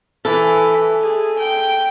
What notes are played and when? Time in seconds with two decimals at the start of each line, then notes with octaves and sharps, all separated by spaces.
0.25 E3 A4
1.02 G#4
1.39 G5